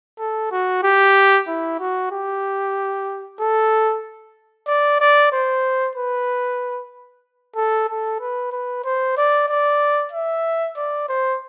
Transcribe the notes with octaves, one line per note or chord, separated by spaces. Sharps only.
A4
F#4
G4
E4
F#4
G4
A4
D5
D5
C5
B4
A4
A4
B4
B4
C5
D5
D5
E5
D5
C5